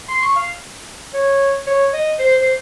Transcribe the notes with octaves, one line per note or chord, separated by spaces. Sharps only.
C6
C#6
F5
C#5
C#5
D#5
C5
C5